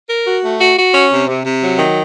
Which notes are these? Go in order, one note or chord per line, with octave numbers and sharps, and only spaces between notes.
A#4
F#4
A3
F#4
F#4
C#4
C3
C3
C3
F#3
D#3